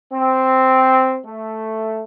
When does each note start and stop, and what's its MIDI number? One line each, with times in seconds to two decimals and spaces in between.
0.13 1.19 60
1.26 2.03 57